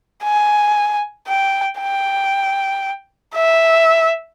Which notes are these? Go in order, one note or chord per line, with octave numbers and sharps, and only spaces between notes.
G#5
G5
G5
E5